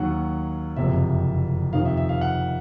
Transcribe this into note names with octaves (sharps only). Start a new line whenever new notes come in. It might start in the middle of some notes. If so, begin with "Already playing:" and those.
Already playing: D#2 D#3 F#3 F#5
F#1 F2 C3 E5
F2 C3 D#3 F5
E5
E5
F5
F#5